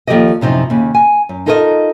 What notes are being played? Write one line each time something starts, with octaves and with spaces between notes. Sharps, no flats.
D#2 F3 G4 A4 D5 D#5
F#2 C3 F3 D#4 E4
D#2 C#3
G#5
F#2
D#4 F4 A4 A#4 C5 D#5